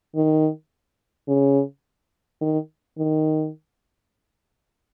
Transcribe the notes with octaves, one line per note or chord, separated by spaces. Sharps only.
D#3
C#3
D#3
D#3